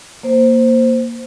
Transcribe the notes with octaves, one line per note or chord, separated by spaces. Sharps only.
A#3 C5